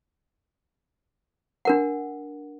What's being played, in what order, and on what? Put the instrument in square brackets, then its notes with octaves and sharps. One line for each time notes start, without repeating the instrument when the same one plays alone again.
[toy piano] D4 A#4 F#5